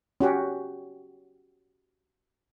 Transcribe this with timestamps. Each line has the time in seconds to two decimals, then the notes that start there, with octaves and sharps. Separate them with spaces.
0.20 C#4 F#4 G4